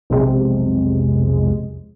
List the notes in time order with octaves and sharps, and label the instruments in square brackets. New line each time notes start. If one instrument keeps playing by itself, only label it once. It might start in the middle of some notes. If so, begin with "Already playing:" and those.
[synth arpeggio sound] B1 F2 C3 G#3